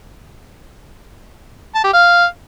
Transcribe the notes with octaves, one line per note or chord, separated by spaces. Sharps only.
A5
G4
F5